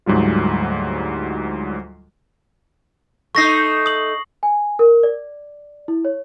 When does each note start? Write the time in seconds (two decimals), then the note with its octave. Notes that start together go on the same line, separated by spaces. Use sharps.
0.06 D2 G#2 F#3 G3 F4
3.35 A3 D#4 C#6 A#6 C7
3.86 D#6 F#7
4.43 G#5
4.79 A#4
5.03 D5
5.88 E4
6.05 C#5